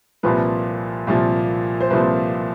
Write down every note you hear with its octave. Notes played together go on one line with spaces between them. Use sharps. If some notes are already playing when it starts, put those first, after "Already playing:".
C2 A#2 F3 B4
C2 A#2 F3
C5
C2 A#2 F3 B4